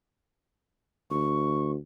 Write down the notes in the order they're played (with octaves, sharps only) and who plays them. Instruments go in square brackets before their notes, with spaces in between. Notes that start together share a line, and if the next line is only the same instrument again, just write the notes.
[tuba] D2 [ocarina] C#6